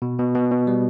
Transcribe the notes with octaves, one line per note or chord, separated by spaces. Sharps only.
B2
B2
B2
B2
G3